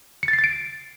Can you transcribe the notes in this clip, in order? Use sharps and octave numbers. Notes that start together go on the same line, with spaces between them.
C#7
A6
C7
A6
D7